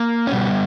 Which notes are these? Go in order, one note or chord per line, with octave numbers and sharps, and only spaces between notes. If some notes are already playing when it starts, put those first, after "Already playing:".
Already playing: A#3
C#4
B2 G3 B3